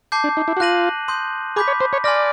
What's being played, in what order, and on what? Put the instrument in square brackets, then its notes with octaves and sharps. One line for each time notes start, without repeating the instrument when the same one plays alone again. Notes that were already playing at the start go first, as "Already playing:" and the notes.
[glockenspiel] A5 D6 G6 C7
[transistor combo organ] D4
D#4
E4
F#4
[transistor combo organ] F4 [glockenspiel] F#6 A#6 D#7 F#7
[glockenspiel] C6 D#6 G6
[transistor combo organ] G#4 [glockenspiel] B5 D6 G6 B6
[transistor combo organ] C#5
C5
C#5
[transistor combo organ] D5 [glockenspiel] G#5 C6 F6 A#6